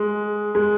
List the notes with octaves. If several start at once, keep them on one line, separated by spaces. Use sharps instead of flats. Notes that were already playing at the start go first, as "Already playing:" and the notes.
Already playing: G#3
G#3